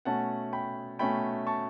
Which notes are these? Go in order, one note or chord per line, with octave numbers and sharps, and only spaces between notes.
B2 A3 C#4 F#5 A5
G5 B5
B2 A3 C#4 G5 B5
A5 C#6